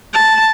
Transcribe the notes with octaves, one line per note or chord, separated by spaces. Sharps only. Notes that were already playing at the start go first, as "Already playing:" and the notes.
A5